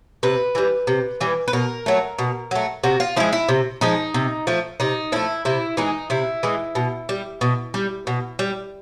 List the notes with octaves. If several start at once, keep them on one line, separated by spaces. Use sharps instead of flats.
C3 B4
E3 G3
C3
E3 G3
B4
B2 A#4
F#3 A3
B2
F#3 A3
C3 F#4
F4
F3 G#3 E4
E4
C3
F3 G#3 D#4
C3
F3 A3
C3 D#4
F3 A3 E4
C3 E4
E3 G#3 D#4
C3 E4
E3 G#3
B2
G3
B2
G3
B2
G3